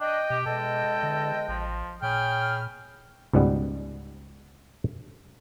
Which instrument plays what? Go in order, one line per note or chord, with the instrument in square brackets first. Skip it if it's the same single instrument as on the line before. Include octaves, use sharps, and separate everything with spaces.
[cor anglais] D4 [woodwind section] D#5 [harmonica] G5
[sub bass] B2 [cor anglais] G4
[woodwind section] E2 G#3 D#5 [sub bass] B2 [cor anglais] A4
[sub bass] D3
[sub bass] A1 [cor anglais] F3
[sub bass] A#2 [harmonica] G#4 [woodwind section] C#5 B5 F6 [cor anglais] G5
[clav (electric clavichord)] C#2 G#2 B2 G3 B3